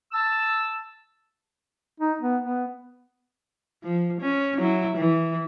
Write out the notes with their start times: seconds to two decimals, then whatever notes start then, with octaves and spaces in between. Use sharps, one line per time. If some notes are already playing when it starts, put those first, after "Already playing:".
0.12 A5 E6
2.00 D#4
2.21 B3
2.42 B3
3.83 F3
4.21 C#4
4.58 F#3 E4
4.97 E3